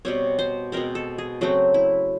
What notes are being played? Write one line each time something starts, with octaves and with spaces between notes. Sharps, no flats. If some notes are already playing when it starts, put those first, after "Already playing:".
B2 G3 C4 C#5
C5
B2 G#3 C4 A#4
A4
G#4
C#3 F#3 A3 C4 F#4
E4